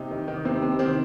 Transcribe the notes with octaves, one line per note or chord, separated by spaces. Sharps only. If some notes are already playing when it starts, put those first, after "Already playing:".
Already playing: C3 D#4
D#3
D#3
C3 C4
C3
D#3 C4